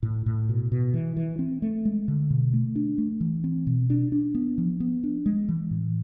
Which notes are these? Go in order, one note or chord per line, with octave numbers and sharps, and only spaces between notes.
A2
A2
B2
B2
E3
E3
C4
A3
G#3
D3
B2
A3
D4
A3
E3
C4
B2
D4
D4
B3
F3
B3
D4
G#3
E3
A2